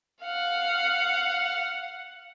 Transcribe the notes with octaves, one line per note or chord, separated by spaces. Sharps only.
F5 F#5